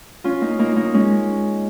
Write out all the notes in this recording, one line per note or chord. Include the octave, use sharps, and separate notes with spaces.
C#4 F4
A#3 D#4
A#3 D#4
A#3 D#4
G#3 C#4